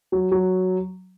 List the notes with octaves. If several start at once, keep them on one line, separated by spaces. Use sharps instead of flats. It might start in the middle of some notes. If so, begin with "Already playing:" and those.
F#3
F#3